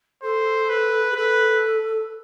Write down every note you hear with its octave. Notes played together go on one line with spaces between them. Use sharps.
A4 C5
B4
G#4
A4 B4